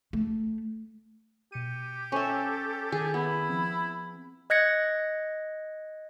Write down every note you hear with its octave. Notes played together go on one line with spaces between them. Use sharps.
A3
B2 G4 C#7 D#7
C#4 A4 C5 E5 G5
D#3 G#4
B3 E4 B5
F3 C4
D#5 F#6 G#6 A#6 C#7